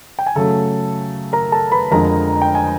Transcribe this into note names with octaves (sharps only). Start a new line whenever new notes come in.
G5
G#5
C#3 F#3 A3 A4 A5
A#4 A#5
A4 A5
B4 B5
F2 D3 F3 G#3 A#4 A#5
G5
G#5